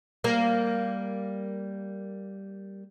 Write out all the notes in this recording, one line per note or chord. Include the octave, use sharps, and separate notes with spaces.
G3 A#3